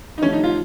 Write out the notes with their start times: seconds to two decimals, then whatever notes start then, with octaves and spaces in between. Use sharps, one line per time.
0.18 D#4
0.22 C3 F3 A3 C#4
0.33 D#4
0.43 F4